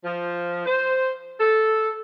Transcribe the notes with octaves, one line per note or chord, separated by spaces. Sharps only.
F3
C5
A4